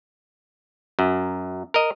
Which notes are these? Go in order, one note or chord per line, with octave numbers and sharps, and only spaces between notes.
F#2
A#4 D#5